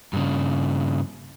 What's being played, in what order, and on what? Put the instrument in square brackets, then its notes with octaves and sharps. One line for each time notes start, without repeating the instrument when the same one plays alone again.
[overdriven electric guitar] G2 C#3